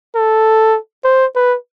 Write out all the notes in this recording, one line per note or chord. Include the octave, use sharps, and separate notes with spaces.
A4
C5
B4